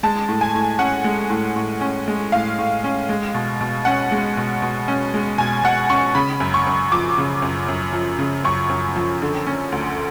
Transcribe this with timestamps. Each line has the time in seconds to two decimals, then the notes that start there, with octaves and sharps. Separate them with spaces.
0.03 G#3 A5
0.29 A2
0.41 G#5
0.55 A2
0.79 C#4 F#5
1.04 G#3
1.30 A2
1.56 A2
1.81 C#4
2.08 G#3
2.32 A2 F5
2.59 A2
2.84 C#4
3.09 G#3
3.34 B2
3.61 B2
3.85 C#4 F#5
4.12 G#3
4.37 B2
4.62 B2
4.88 C#4
5.14 G#3
5.38 B2 G#5
5.64 B2 F#5
5.90 C#4 C#6
6.15 C#3 B5
6.40 F#2
6.54 C#6
6.67 F#2
6.92 F3 D6
7.18 C#3
7.42 F#2
7.69 F#2
7.93 F3
8.19 C#3
8.44 F#2 C#6
8.70 F#2
8.96 F3
9.22 D3
9.47 C#4
9.72 D2